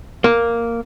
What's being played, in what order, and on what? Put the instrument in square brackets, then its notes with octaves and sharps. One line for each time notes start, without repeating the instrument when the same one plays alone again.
[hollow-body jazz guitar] A#3